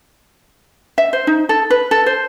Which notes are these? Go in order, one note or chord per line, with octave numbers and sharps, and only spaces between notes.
E5
C5
D#4
A4
B4
A4
C5